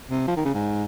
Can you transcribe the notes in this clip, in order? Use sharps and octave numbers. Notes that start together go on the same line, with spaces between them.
C3
F3
D#3
C#3
G#2